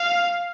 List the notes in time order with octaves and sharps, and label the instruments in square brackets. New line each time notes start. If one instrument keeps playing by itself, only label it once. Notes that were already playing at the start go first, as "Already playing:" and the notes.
Already playing: [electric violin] F5